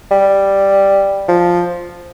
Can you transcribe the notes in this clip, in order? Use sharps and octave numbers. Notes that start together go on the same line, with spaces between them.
G3
F3